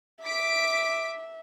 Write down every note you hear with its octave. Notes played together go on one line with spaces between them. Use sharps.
E5 D6 B6 D7